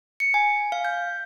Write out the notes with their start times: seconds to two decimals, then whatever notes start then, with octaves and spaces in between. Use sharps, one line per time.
0.20 C#7
0.34 G#5
0.72 F5
0.85 G6